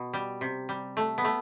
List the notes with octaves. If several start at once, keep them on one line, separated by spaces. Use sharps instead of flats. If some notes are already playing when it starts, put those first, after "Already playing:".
Already playing: B2
G3
C3
G3
A3
B3
A3